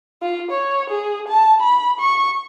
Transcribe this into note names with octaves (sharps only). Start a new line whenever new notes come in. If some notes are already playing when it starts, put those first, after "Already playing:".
F4
C#5
G#4
A5
B5
C#6